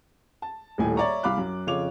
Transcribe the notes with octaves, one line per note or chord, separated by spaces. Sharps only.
A5
D#1 D#2 A2 D#4 G#5
C#5 D5 E5 A#5 C#6
C2 F5 B5 D6 F#6
F#2
F2 C#3 F4 C#5 D6 F7